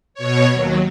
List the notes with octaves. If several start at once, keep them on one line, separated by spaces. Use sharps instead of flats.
B2 C#5
D#2 F#3